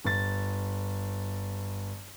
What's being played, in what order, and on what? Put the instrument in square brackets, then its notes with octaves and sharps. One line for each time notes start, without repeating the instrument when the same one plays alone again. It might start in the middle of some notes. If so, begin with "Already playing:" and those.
[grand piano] G1 A6